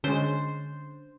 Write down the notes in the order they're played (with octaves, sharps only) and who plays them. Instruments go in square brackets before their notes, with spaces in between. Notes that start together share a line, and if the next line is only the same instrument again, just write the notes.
[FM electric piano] D3 [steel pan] G#3 C#4 [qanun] C5